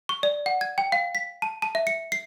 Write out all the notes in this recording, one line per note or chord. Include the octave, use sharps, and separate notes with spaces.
C#6
D5
F#5
G#6
G5
F5
B6
A5
A5
E5
C#7
C7